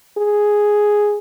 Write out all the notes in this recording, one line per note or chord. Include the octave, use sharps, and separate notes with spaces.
G#4